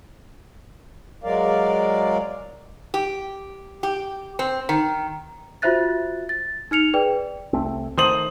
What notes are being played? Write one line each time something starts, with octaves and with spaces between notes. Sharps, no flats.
F#3 G#3 A#4 D5 F5
G4
G4
C4
D#3
F4 F#4 C5 E5 F#6 A6
A6
D#4 F6 C#7 F7
G#4 B4 D5 G5
C2 A3 C4
D#3 A3 C5 D#6 F#7